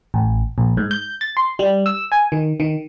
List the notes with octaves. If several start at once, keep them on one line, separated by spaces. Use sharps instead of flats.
A1
A#1
G#2
G6
A6
C6
G3
E6
G#5
D#3
D#3